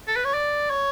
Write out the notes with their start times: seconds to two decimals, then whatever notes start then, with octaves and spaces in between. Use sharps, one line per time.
0.07 A4
0.16 B4
0.25 C#5
0.34 D5
0.70 C#5